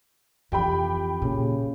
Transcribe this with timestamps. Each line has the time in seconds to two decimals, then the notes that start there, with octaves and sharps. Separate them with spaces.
0.52 F2 E3 G4 G5 B5
1.22 A#2 C#3